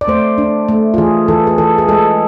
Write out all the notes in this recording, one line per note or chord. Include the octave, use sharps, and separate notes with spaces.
D5
A3 C5
D4
A3
F4
E3 G#4
E3 A4
G#4
E3 A4
G#4
G#3 A4